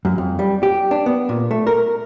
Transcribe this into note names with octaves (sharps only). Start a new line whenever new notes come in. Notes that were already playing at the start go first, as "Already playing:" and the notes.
F#2
F2
G3
G4
D4
B3
A#2
A3
A#4